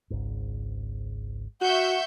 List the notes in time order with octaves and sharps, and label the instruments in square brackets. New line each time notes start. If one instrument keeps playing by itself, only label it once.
[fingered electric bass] G#1 C#2 G#2
[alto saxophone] F#4 [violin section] E5 C#6 G6 [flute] F#5